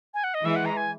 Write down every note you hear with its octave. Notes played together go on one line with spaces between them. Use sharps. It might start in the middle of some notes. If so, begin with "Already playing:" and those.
G#5
F#5
D#5
E3 G#3 E5
F#5
A#5
G#5